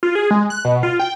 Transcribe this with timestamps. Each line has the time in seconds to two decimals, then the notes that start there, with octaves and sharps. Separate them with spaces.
0.03 F4
0.15 G#4
0.31 G#3
0.50 F#6
0.65 B2
0.83 F4
1.00 G5